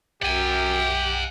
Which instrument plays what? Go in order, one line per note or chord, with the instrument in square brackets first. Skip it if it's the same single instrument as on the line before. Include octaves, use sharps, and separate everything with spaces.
[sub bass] B1 [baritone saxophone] F#2 [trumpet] G4 [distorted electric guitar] F#5 G#5